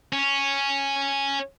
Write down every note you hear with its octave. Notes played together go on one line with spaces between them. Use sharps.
C#4